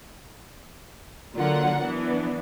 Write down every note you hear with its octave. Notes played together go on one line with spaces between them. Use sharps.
D3 F#3 A#3 F4 A#4 F#5
E3 B3 D4